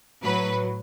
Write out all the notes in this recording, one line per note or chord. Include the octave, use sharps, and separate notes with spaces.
A2 F#3 B4